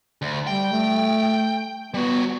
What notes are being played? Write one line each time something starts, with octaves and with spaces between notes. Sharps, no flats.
D2
G3 G5
A3
G3 B3 F#4